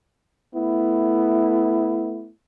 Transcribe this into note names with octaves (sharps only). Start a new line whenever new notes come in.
A3 B3 E4